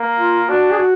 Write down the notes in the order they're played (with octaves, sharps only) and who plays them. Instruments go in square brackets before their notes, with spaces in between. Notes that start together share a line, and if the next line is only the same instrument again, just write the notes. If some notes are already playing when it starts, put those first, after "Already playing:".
Already playing: [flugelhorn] A#3
[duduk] F4
[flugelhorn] D4 [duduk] F#4
[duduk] G#4
F#4